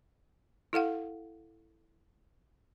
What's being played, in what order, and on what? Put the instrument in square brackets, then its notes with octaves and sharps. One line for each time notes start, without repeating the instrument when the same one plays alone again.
[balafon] E4 A4 F5 F#5